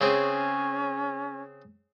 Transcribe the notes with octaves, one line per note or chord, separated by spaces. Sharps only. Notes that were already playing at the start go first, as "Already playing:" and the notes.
C#3 C4 C#4 G#4